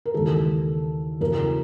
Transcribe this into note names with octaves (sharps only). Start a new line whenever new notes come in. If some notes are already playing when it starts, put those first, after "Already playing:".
A#4
D#2 C#3 E3 G#3 A4
E2 C#3 F#3 A#4